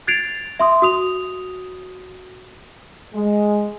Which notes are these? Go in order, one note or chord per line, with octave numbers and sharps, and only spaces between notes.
F#6 G#6 A6 C7 D7 F7
E5 C6 D#6
F#4 D#6 F7
G#3